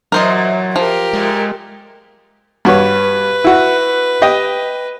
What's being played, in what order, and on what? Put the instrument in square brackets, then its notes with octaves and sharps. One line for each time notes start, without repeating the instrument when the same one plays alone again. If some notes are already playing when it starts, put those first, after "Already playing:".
[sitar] F#2 A#2 E3 [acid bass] F#3 [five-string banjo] A#4 C5 D#5
[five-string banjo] F3 [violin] G4 A#4
[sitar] A#2 A3 [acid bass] G#3
[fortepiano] G2 F#4 C#5 [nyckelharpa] B4
[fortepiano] E4 F#4
G4 D#5